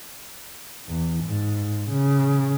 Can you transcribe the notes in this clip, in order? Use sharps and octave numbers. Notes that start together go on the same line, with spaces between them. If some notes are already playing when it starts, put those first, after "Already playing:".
E2
G#2
C#3